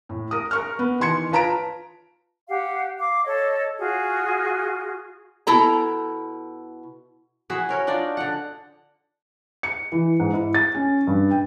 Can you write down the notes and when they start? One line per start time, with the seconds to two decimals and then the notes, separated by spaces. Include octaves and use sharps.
0.09 A2
0.31 A#4 D#6
0.51 A#4 C#6 F6
0.79 B3
1.00 D#3 E3 C6 G#6 C#7
1.32 F4 B4 A5 A#5 B6 D7
2.48 G4 F5 F#5
2.99 F5 D6
3.24 A4 C#5 D#5
3.78 F4 F#4 G#4
5.47 B2 E4 A4 A#5
7.50 E4 F#4 G#4 E5
7.69 C#4 A#4 C#5
7.87 D4 D#4 F4 D5
8.17 D3 F#5
9.63 C#7
9.92 E3
10.20 G#2
10.33 E4
10.54 A6
10.75 C#4
11.07 G2
11.31 G5